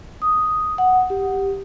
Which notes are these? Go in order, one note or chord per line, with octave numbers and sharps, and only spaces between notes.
D#6
F#5
G4